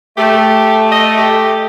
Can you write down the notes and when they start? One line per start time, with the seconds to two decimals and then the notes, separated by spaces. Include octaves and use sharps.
0.17 A3 G4
0.91 D#5
1.17 G4